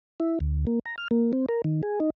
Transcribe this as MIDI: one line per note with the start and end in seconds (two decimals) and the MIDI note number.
0.20 0.39 64
0.40 0.65 38
0.67 0.79 58
0.86 0.96 82
0.98 1.08 89
1.11 1.32 58
1.33 1.46 60
1.49 1.62 70
1.64 1.82 51
1.83 1.99 68
2.00 2.10 63